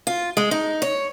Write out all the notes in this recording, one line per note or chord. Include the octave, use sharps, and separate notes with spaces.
F4
G#3
D#4
C#5